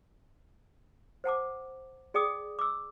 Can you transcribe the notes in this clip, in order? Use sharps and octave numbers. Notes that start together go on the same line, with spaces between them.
C5 F#5 A5 D6
G#4 D5 G5 D6 D#6
D6 E6